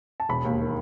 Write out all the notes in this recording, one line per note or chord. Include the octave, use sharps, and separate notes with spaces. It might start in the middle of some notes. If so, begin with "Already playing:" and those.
A5
E1 B5
D#2
D#3